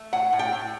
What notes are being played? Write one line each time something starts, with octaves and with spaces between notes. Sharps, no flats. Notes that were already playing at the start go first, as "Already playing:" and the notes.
Already playing: A3
A2 F#5
A2
G5
A2